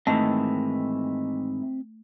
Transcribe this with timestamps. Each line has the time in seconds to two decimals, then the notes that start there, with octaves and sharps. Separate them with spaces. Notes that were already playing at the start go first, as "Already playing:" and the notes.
0.07 G#2 D#3 E3 A3 C4 D#5 E5